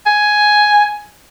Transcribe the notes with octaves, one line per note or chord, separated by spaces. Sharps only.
G#5